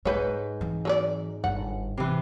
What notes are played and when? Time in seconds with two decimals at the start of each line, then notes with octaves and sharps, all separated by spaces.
0.05 G#2 G#3 B4 C#5 G6
0.61 E3 C4
0.85 F#3 A4 D5
1.44 G1 F#5
1.97 C3 E3